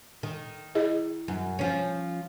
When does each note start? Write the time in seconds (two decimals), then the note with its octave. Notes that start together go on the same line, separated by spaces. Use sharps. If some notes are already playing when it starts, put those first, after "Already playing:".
0.23 D#3
0.75 E4 G#4 D#5
1.28 F#2
1.59 F3 C#4